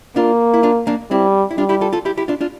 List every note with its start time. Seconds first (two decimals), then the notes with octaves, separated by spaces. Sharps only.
0.16 A#3 D4 F4
0.54 E4
0.63 D4 F4
0.87 A#3 D4
1.11 G3 C4 E4
1.51 E4
1.58 G3 D4 F4
1.69 E4 G4
1.81 F4 A4
1.93 F4 A4
2.05 E4 G4
2.17 E4 G4
2.28 D4 F4
2.41 D4 F4